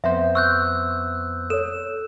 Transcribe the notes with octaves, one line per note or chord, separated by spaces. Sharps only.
F2 B3 C5 E5
C#6 E6 F#6 G6
A4 C#5 E7